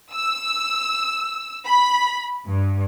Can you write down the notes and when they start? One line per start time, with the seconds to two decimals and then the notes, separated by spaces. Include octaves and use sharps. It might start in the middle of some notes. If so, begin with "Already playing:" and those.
0.11 E6
1.65 B5
2.47 G2